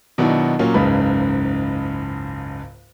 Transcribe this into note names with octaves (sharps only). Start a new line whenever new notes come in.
B2 D#3 F#3 B3 D4 E4
A#2 F#3 A#3 C#4
F#1 C#2 G#2 C#3 B4 B5